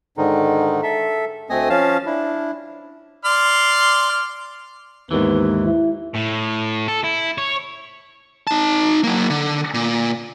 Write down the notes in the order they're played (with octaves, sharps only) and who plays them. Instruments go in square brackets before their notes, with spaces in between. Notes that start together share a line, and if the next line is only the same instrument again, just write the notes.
[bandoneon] G#2 D3 D#3 D#4
A4 E5
D2 A3 C4 D#5 G#5 D#6
F3 C#4 F5 A5
D4 E4
[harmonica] D5 C6 F6
[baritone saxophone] D#2 [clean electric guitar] G#2 E3 [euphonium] B3
[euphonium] E4
[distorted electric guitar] A2
A4
E4
C#5
[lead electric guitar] D#4 A5
F#3 A#3
D3
A#2